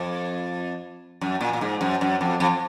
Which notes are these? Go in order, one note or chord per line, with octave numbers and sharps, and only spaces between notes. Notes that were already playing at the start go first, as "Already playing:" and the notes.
Already playing: F2
F#2
A#2
A#2
G#2
F#2
F#2
F2
F2